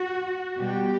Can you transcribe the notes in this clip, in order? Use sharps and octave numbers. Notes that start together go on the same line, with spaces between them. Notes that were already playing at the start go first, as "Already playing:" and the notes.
Already playing: F#4
B2 G3 G4